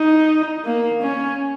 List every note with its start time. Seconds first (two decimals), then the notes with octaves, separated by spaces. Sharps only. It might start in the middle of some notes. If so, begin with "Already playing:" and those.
Already playing: D#4
0.66 A#3
1.02 C#4